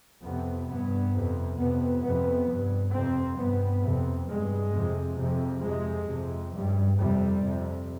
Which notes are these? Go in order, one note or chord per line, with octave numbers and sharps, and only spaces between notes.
F2 C3 B3
G2 B3
F2 C3
F2 C3 B3
F2 C3 B3
G2
F2 C3 C4
G2 B3
F2 C3
G2 G#3
F2 C3
F2 C3
F2 C3 G#3
F2 C3
G2 G3
F2 C3 G3
F2 C3